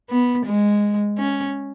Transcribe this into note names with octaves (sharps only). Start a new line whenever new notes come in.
B3
G#3
C#4